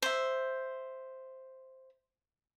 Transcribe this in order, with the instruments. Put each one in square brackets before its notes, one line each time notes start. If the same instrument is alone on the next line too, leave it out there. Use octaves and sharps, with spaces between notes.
[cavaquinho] C5 E5